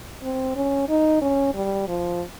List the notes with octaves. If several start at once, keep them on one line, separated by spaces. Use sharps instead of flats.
C4
C#4
D#4
C#4
G3
F3